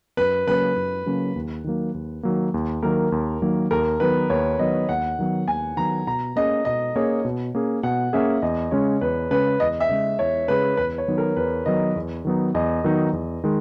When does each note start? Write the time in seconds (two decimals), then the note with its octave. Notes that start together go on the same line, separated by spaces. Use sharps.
0.17 F#2 B4
0.47 C#3 F#3 A#3 C#4 B4
0.76 F#2
1.06 C#3 F#3 A#3 C#4
1.36 D#2
1.64 D#3 F#3 A#3
1.94 D#2
2.23 D#3 F#3 A#3
2.54 D#2
2.83 D#3 F#3 A#3 A#4
3.12 D#2
3.42 D#3 F#3 A#3
3.71 D#2 A#4
4.00 D#3 F#3 B3 B4
4.30 D#2 C#5
4.59 D#3 F#3 B3 D#5
4.89 D#2 F#5
5.19 D#3 F#3 B3
5.48 D#2 G#5
5.77 D#3 F#3 B3 A#5
6.07 B2 A#5
6.36 A#3 C#4 G#4 D#5
6.65 B2 D#5
6.95 A#3 C#4 G#4 C#5
7.25 B2
7.55 A#3 C#4 G#4
7.83 B2 F#5
8.13 A#3 C#4 G#4 E5
8.42 E2 D#5
8.71 C#3 G#3 C#4 G#4 C#5
9.01 E2 B4
9.30 C#3 G#3 C#4 G#4 B4
9.60 E2 D#5
9.80 E5
9.89 C#3 G#3 C#4 G#4
10.19 E2 C#5
10.48 C#3 G#3 C#4 G#4 B4
10.77 E2 B4
10.98 C#5
11.08 D#3 F#3 B3 D#4
11.18 A#4
11.36 E2 B4
11.66 D#3 F#3 B3 D#4 D#5
11.96 E2
12.25 D#3 F#3 B3 D#4
12.55 E2 D#5
12.84 D#3 F#3 B3 D#4
13.13 E2
13.44 D#3 G#3